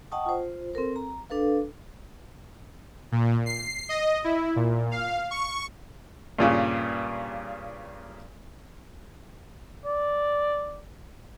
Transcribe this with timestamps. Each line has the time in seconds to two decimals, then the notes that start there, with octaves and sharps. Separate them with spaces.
0.12 D#5 F#5 G5 A5 C#6 D#6
0.26 F4 C5
0.73 C4 A4 A#4 C5
0.96 A#5
1.30 D4 A4 B4 F5
3.12 A#2
3.46 C7
3.89 D#5
4.24 E4
4.56 A#2
4.91 F5
5.31 C#6
6.39 G2 A#2 C#3
9.85 D5